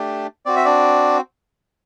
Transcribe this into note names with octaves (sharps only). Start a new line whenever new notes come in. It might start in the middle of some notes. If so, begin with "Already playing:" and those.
Already playing: A3 D4 G4
C4 F#4 D5
E5
D4 D5